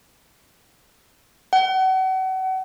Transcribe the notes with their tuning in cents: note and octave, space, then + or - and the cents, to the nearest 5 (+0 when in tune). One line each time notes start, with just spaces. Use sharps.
F#5 +35